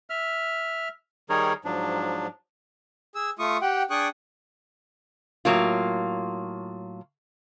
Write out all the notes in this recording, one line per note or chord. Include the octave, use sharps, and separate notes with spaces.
E5 F6
D#3 G3 D#4 G#4 A#4 C#5
G#2 F3 F#3 D4
G#4 E6
A3 F4 C#6 D#6
G4 F#5 G5
D4 G#4 G5 C#6 D#6 F#6
A2 F#3 A#3 F4